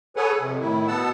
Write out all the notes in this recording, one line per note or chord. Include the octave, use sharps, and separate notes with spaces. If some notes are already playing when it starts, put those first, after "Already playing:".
G#4 A4 B4 C#5 F#5 G#5
F2 C3
A2 D#3 E4
B2 B3 F#5 A5 E6